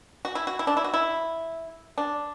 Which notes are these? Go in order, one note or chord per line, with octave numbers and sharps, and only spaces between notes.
F#4
E4
F#4
E4
D4
E4
F#4
E4
D4